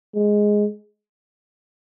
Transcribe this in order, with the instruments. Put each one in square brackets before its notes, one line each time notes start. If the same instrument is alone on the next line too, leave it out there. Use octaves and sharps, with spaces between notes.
[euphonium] G#3